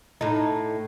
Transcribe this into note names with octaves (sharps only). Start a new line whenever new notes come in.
A2 D#4